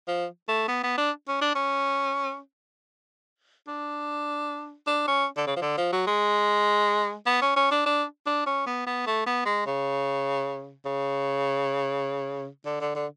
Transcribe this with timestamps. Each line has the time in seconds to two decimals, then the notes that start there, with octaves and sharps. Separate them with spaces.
0.07 F3
0.48 A3
0.68 B3
0.83 B3
0.97 D4
1.28 C#4
1.41 D4
1.55 C#4
3.67 D4
4.87 D4
5.07 C#4
5.37 D3
5.47 C#3
5.56 F3
5.61 D3
5.77 F3
5.92 F#3
6.07 G#3
7.26 B3
7.41 C#4
7.56 C#4
7.71 D4
7.86 D4
8.26 D4
8.46 C#4
8.67 B3
8.86 B3
9.07 A3
9.26 B3
9.45 G#3
9.66 C#3
10.85 C#3
12.65 D3
12.81 D3
12.95 D3